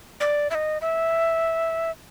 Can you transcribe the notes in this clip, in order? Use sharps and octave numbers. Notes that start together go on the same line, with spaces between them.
D5
E5
D#5
E5